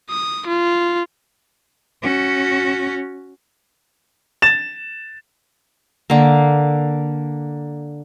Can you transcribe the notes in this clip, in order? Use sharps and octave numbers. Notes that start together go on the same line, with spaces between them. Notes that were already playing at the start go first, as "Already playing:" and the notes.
D#6
F4
C#4 F#4
A6 E7
D3 A#3